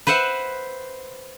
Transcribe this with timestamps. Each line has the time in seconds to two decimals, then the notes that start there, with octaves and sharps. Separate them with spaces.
0.07 B4 C5 E5 F#5